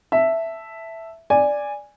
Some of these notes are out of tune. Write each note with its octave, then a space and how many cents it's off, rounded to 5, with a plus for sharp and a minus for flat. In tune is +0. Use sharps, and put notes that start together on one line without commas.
E5 +0 A5 +0
D5 +0 G#5 -10